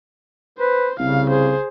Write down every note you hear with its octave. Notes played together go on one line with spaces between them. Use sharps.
B4 C5
C2 C#3 F5
G#4 C5